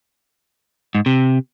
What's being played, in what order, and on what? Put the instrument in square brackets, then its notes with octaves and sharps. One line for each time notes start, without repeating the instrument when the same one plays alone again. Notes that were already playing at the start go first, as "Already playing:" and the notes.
[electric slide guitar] G#2
C3